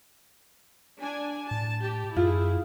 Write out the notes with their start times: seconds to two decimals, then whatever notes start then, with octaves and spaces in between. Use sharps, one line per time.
1.01 D4 G#5
1.51 A2 A5
1.83 G4
2.16 F#2 E4 F4 G#4